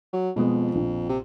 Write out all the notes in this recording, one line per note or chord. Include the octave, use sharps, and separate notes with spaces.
F#3
F2 B2 G#3 B3
A#1
C3